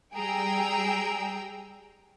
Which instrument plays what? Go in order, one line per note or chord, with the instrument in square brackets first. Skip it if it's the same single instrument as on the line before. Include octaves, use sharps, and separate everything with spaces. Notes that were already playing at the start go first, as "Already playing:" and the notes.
[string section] G3 G#4 G5 A#5 E6